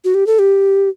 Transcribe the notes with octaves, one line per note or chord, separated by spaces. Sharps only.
F#4
G4
A4
G4